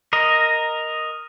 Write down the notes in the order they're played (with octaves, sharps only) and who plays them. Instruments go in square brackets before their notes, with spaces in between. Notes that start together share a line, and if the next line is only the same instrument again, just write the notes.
[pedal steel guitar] A#4 D#5